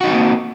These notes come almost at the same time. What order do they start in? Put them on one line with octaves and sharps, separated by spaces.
F#4 D#4 F#3 C4 A#3